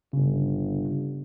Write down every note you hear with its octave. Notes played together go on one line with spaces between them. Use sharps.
G1 C#3